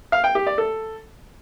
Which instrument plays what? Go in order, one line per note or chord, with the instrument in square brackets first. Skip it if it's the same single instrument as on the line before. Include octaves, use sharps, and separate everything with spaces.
[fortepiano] F5
G5
G4
D5
A4